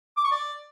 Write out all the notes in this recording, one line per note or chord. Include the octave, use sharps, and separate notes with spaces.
D6
C#6
D5